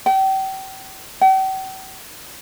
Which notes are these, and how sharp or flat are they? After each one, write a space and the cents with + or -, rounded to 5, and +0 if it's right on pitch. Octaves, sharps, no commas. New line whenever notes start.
G5 -35
G5 -45